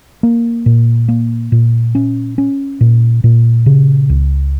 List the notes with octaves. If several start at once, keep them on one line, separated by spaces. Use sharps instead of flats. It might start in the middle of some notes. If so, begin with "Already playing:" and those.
A#3
A#2
A#3
A#2
C#4
C#4
A#2
A#2
C#3
C#2